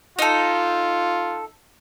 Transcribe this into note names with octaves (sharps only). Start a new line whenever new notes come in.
D#4 F4 A4